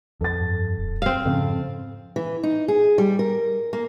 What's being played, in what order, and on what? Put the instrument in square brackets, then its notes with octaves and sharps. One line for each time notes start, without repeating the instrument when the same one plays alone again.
[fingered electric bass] F2 [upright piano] A4 A6
[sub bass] G2
D1
[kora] C4 F5
[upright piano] F2 [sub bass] G#2 [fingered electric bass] C#3
[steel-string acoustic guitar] E3
D#4
G#4
G3
A#4
A#3